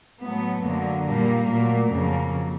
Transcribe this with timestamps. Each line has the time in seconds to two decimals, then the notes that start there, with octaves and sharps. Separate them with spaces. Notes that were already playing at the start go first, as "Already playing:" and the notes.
0.24 A2 F#3 A3 B3
0.66 F#2 D3 F#3 A#3
1.08 A#2 G3 A#3
1.49 A#2 F#3 A3 A#3
1.91 F2 C#3 F#3 A#3